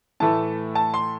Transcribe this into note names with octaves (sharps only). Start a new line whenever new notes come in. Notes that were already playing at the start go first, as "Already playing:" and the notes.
A2 E3 A3 A5
A5
C6